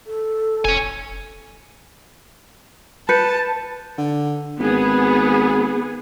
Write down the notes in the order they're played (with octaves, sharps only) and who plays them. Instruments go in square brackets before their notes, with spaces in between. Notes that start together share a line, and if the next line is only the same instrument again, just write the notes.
[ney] A4
[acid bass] F1 [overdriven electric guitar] C#5 G#5
[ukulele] B4 [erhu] A5 [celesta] F#6 G6 C#7
[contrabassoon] D3
[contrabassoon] G#1 [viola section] B3 G#4